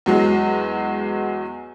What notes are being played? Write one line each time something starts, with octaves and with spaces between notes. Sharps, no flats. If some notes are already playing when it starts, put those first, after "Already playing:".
E2 F#3 G#3